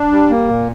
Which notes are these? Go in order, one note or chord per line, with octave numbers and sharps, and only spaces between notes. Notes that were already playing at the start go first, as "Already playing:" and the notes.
Already playing: D4
G3
A#3
A#2